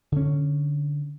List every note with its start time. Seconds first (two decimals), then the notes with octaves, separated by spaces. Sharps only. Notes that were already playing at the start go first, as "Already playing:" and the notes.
0.12 D3 C#4